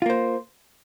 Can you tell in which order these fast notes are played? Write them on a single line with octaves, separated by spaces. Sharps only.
F4 A#3 C5